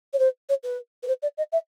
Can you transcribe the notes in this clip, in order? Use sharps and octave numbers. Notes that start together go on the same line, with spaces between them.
C#5
C5
C#5
B4
B4
C5
D5
D#5
E5